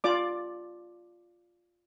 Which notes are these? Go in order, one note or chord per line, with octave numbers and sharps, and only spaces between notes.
F4 D5 D6